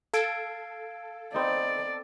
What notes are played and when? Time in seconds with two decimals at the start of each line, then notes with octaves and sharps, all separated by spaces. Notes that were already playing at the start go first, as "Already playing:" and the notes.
0.14 A4 F5 G#6 D7
1.34 B3 C4 D#4 D5